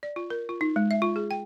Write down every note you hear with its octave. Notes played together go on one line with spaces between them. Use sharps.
D5
F4
A#4
F4
D#4
G#3
E5
F4
G#4
G5